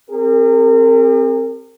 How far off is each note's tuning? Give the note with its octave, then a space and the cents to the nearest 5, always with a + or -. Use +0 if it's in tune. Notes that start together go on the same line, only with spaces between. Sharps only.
C4 +5 G4 +40 A#4 -35